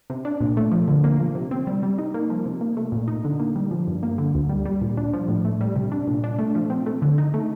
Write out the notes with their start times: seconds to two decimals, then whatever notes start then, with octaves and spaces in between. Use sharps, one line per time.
0.10 C3
0.25 D4
0.41 A#2
0.57 A3
0.72 F3
0.88 D3
1.04 A#3
1.20 F3
1.35 C3
1.51 C4
1.67 G3
1.83 G3
1.98 D#4
2.14 A#3
2.30 F3
2.46 C3
2.61 A#3
2.77 A3
2.92 A#2
3.08 D#4
3.24 D3
3.40 A#3
3.56 G3
3.71 F3
3.87 G2
4.03 A#3
4.18 D3
4.34 D2
4.49 G3
4.66 G3
4.82 A#2
4.97 D4
5.13 F3
5.28 A2
5.45 A3
5.61 G3
5.76 C3
5.92 D4
6.08 A#2
6.24 D4
6.39 A3
6.55 F3
6.70 C4
6.86 A3
7.02 D3
7.18 D#4
7.34 A3